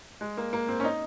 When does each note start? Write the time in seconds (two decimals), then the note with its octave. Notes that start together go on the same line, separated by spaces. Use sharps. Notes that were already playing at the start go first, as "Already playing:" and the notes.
0.21 G#3
0.37 A#3
0.53 A#3
0.68 C4
0.80 C#4
0.84 D#4